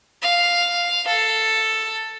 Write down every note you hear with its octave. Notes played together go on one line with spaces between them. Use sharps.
F5
A4